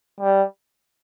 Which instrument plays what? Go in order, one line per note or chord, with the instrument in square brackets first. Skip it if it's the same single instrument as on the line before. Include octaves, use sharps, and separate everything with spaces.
[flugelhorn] G3